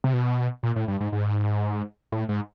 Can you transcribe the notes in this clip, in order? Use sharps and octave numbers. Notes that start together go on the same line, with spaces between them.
C3
B2
A#2
A2
G2
G#2
G#2
A2
G#2